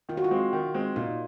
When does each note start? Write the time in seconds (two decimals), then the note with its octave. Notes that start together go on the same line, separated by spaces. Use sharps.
0.09 D#3 F4
0.17 F#4
0.24 F4
0.31 G#3 C4
0.53 D#3
0.74 G#3 C4
0.96 A#2 D#4